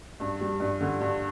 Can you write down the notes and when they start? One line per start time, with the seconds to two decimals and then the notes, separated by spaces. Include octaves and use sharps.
0.20 G2
0.41 G3
0.60 G2
0.81 D3
1.00 G2